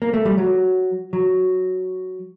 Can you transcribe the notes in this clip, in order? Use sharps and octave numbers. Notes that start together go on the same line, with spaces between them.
A#3
A3
G3
F#3
F#3